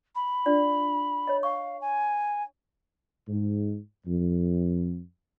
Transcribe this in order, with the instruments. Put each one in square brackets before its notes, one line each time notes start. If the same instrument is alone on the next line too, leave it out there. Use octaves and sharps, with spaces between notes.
[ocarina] B5
[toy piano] D4 F4 D5
C#5 D#5
[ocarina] F5 [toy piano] C#6
[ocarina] G#5
[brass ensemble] G#2
F2